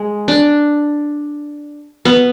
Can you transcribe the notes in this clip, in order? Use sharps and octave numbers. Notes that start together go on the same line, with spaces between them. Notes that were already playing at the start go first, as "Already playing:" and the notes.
Already playing: G#3
D4
B3